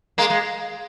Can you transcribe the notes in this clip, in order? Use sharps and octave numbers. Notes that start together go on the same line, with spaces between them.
G#3 A#3
G#3